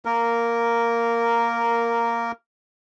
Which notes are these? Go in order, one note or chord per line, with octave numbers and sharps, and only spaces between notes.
A#3 A#4